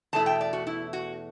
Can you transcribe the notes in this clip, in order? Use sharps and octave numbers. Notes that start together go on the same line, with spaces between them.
E2 B2 A3 E4 A5
G5
D5
F#4
E4
F#4